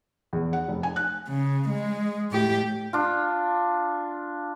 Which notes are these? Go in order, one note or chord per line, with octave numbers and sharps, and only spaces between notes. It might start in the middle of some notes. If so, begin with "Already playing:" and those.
E2
F#5
F1
G#5
F#6
C#3
G#3
A2 G4
D4 F4